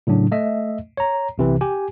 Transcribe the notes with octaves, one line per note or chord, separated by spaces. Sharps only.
A2 C#3 F#3 D4
A3 D#5 E5
C#5 A#5
B1 C3 E3
G4 G#5